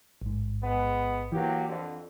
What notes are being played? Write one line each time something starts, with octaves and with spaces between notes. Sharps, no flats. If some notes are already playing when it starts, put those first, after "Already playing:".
A1 G#2
G#3 B3
E3 F#3 A#3 G4
F2 D3